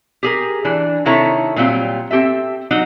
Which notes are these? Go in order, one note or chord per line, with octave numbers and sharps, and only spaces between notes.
G4 G#4 A#4
E3 D4
C3 D#3 E4 A4 C#5 A#5
A#2 F#3 G3 C4 F4
C4 G4 A4 E5
F#3 D#4 F#4